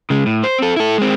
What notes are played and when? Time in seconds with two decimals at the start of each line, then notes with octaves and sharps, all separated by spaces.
0.10 C#3 G#3
0.26 A2
0.44 C5
0.58 C4 A4
0.76 E4 A4
0.98 G#3 C4